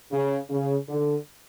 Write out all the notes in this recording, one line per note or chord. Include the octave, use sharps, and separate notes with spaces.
C#3
C#3
D3